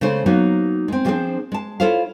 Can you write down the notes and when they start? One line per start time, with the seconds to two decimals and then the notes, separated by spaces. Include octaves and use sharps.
0.01 C#3 G#3 A3 G#4 C5
0.26 F#3 A#3 B3 D#4 F#4
0.88 G#3 C4
1.05 F3 G3 C4 D4 G#4 C5
1.52 G#3 A5
1.80 E4 F4 A4 C5 C#5 F5